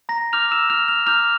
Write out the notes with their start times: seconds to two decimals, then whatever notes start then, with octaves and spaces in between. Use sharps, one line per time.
0.09 A#5 A#6
0.33 A#5 D6 F6 G6 F7
0.51 E6 E7
0.70 F6 F7
0.88 F6 F7
1.06 A#5 D6 F6 G6 F7